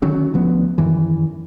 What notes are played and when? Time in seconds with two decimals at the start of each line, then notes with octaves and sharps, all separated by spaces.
0.02 D3 D#3 F#3 C#4
0.34 D2 F3 B3
0.78 F#2 D#3 E3